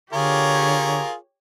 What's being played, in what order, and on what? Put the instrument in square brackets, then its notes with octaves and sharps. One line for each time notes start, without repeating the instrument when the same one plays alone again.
[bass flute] D3 [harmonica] F4 G#4 A#4 [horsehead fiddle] G4 C#5